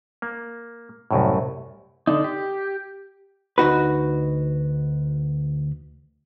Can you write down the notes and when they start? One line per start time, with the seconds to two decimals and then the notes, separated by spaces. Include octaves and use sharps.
0.22 A#3
1.11 C2 F#2 A2
2.07 D3 D4 D#4
2.24 G4
3.58 D2 D#4 F#4 B4